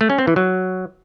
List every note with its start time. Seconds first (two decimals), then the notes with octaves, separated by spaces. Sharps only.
0.01 A3
0.10 C#4
0.18 C4
0.27 E3
0.36 F#3